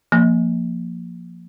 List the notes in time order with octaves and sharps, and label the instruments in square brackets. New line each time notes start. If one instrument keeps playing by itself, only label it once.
[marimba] F3 A#3